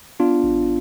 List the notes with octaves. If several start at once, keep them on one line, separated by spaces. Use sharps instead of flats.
B3 D4 F4
A1